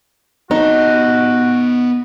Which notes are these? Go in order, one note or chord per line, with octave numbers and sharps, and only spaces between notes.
B3 D#4 F#4 A5